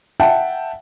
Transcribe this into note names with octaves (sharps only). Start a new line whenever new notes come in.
E5 F#5 G5 A5